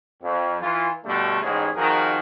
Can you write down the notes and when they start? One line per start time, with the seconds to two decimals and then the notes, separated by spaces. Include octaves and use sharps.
0.23 F2
0.61 E3 F4
1.05 B2 D3 G3 A3
1.41 A1 G#2 G#4
1.75 F2 D#3 F3 F#4 G#4 A#4